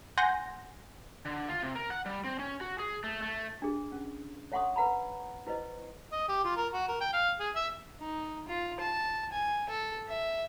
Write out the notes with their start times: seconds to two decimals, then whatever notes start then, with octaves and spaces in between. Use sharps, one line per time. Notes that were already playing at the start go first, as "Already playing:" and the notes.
0.18 F#5 G#5 C6 G6 A#6
1.25 D3
1.48 F4
1.62 C3
1.75 A#4
1.90 F#5
2.06 G3
2.24 C4
2.39 C#4
2.61 F#4
2.79 G#4
3.04 A3
3.23 A3
3.62 D4 G#4
3.92 C#4
4.52 C#5 E5 F#5 C6 C#6 D#6
4.76 B4 F#5 A#5 B5
5.47 E4 B4 C5 D#5
6.12 D#5
6.28 G4
6.44 F4
6.56 A#4
6.73 F#4
6.88 A#4
7.01 G5
7.13 F5
7.40 G#4
7.56 E5
8.00 D#4
8.49 F4
8.80 A5
9.32 G#5
9.70 A4
10.09 E5